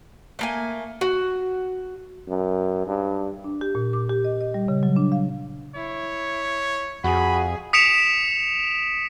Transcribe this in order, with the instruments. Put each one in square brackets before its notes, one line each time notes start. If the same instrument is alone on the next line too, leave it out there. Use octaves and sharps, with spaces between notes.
[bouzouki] A3 A#3 G#5
F#4
[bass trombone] F#2
G2
[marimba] D4
G4
A#2
D6
G4
D#5
D#5
G3
C#3
F#3
D4
F5
[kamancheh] E4 [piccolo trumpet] C#5
[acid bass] F2 [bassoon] F#4 [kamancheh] G#4 [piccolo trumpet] B5
[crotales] D#6 B6 C#7 D7 E7 F7